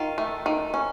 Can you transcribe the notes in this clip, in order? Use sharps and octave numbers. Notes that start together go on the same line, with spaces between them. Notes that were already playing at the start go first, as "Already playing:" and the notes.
Already playing: D#3 F4
A3
D#3
C#4